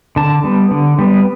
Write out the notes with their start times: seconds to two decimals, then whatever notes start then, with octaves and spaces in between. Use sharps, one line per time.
0.16 D3 A5
0.44 G3 B3
0.71 D3
0.99 G3 B3